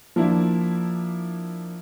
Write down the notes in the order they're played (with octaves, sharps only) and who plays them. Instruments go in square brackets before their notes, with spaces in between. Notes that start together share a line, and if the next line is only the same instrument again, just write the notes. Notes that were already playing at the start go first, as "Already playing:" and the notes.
[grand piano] F3 A#3 D4 E4